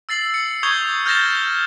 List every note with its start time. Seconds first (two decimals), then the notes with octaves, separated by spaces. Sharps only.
0.09 E6 A6 C7 F#7
0.34 C#7
0.63 C#6 D#6 G6 G#6 C7 G7
1.06 F6 G6 A6 A#6 E7